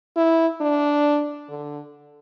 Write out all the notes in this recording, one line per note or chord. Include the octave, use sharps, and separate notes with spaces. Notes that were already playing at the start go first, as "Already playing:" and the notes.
E4
D4
D3